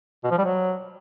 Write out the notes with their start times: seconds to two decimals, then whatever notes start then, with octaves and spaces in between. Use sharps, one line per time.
0.24 B2
0.31 F3
0.38 G3
0.45 F#3